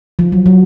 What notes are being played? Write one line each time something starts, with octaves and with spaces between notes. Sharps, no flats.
F3
F#3
F#3